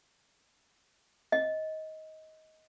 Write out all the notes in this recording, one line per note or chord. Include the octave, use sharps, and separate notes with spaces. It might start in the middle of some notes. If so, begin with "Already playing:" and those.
D#5